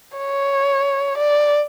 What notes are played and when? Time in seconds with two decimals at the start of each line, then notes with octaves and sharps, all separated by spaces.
0.17 C#5
1.18 D5